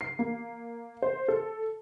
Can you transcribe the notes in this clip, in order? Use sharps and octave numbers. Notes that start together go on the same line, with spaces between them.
C7
A#3
C5
A4